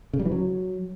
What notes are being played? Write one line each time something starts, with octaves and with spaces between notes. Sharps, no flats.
C#3
G3
E3
F#3